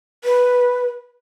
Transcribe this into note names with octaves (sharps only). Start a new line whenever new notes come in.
B4